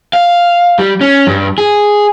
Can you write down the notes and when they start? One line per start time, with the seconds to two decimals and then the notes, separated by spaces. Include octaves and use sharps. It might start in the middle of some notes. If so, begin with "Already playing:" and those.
0.13 F5
0.79 G3
1.01 C#4
1.27 G2
1.58 G#4